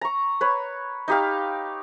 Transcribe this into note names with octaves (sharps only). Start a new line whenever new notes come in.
A#5 C#6
B4 C#5
D#4 G4 F5